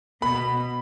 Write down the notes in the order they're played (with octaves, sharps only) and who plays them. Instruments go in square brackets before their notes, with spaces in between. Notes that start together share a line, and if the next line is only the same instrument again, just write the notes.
[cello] B2 [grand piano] B5